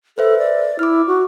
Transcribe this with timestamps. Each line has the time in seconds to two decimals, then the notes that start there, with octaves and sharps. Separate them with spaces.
0.18 A4 B4 C5 E5
0.39 D5
0.79 E4 D6 F6
1.07 F#4